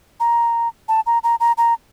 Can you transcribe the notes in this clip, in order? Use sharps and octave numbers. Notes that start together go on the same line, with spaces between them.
A#5
A5
A#5
A#5
A#5
A#5